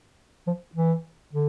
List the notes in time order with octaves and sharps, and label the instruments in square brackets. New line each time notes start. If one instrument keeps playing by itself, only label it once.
[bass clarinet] F3
E3
D3